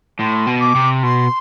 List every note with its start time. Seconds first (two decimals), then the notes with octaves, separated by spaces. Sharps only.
0.20 A2 C6
0.47 B2
0.61 D6
0.75 C3
1.03 B2 C6